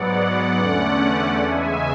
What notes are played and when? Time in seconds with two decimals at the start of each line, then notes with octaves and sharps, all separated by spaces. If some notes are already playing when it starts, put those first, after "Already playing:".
Already playing: G#2 F#3 B3 D5 F#5
0.13 D5 F#5
0.57 E2 D3 A3 C#4 D5 F#5
1.44 E2 C#3 G#3 E5 G#5